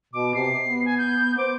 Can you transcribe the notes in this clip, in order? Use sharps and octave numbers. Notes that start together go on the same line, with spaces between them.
B2 D6
C3 C7
B3
G#5
G6
C5 D6